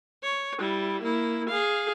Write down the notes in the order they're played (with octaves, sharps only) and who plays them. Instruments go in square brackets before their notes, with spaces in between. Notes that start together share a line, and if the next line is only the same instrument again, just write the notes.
[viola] C#5
G3 E4
A#3 E4
G#4 F5